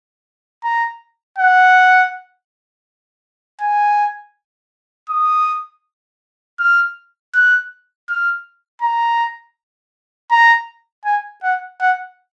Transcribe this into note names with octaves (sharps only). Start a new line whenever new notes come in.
A#5
F#5
G#5
D#6
F6
F#6
F6
A#5
A#5
G#5
F#5
F#5